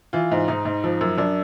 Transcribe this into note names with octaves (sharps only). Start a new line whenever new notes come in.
E3 F4
G#2
G#2 D#4
G#2
F3
F#2
F#2 D4